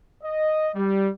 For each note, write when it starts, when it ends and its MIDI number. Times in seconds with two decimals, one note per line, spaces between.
0.23 0.69 75
0.75 1.08 55